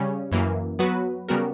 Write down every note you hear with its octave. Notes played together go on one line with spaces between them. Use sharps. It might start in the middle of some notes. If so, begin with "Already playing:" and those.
Already playing: C#3 G3 C#4
F#2 E3 A#3
F#3 B3 F#4 B4
C#3 G3 B3 F#4 A#4